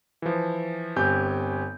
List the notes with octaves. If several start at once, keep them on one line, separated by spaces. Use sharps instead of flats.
E3 F3
G1 C4 G4 G#5 G6